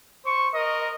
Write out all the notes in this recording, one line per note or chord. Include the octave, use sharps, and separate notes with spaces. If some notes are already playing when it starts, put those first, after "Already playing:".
C5 C#6
A#4 D#5